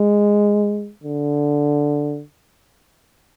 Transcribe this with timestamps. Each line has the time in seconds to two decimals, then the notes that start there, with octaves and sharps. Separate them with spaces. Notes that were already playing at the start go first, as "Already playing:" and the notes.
Already playing: G#3
1.04 D3